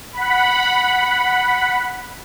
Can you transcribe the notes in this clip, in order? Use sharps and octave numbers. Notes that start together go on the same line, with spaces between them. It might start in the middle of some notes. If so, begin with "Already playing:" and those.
F#5 B5